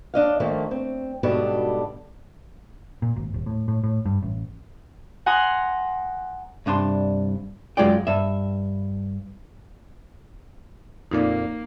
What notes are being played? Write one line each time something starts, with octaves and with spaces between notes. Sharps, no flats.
D4 D#5 F5
D#3 F3 A3 A#3
C4
D2 G#2 B2 G3 D4 A4
A#2
G#1
D#1
A2
A2
A2
G2
A1
F#5 G#5 A#5 C6 D#6
C2 G2 D4 C6
F#2 D#3 G#3 F4 D5 G5
G2 E5
F2 A#2 A#3 D#4 D5 F5